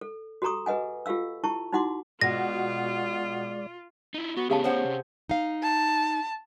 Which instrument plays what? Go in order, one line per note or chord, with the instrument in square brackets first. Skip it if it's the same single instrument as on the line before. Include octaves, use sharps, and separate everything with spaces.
[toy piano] A4
F#4 G4 A4 A#5 C#6 D#6
G#4 B4 D#5 F#5 G#5
F4 G4 A4 F5 E6
E4 G4 A5 C#6
D#4 E4 F#4 F#5 C6 D6
[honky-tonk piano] B2 F#4 [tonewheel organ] G#3 D5 [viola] F4 [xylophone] A#6
[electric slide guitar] D#4 E4
[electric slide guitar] B3 [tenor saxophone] F#4
[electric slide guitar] A2 B3 [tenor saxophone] C#3 [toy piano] G4 F5 A5
[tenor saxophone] C#4 [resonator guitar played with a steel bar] G#4 C5 F#5
[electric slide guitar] C3
[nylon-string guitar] D#4 F5
[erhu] A5